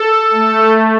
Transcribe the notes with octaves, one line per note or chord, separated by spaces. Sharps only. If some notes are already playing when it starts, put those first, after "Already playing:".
Already playing: A4
A3